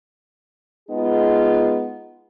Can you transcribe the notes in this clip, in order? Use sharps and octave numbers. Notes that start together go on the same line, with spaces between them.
G#3 B3 D#4 F4 G#4